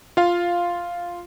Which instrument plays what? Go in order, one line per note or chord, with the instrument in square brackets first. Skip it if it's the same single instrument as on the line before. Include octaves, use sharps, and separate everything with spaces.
[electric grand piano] F4 F5